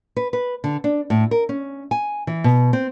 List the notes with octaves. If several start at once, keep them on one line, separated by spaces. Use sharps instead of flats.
B4
B4
D3
D4
A2
A#4
C#4
G#5
E3
B2
C4